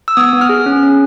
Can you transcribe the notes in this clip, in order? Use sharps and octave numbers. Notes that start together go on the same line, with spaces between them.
E6
B3 D#6
B3
F6
G#4
C#4
C#4